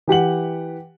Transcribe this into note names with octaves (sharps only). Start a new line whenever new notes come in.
E3 G4 F#5 F#7